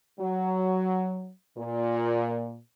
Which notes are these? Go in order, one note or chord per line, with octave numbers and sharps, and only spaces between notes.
F#3
A#2